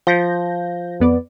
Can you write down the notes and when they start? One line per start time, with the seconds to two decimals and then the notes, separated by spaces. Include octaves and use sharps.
0.07 F3 G6 A#6
1.00 F2 B3 D5